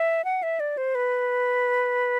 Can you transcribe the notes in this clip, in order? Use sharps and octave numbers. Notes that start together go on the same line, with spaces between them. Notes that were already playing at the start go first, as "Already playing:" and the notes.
Already playing: E5
F#5
E5
D5
C5
B4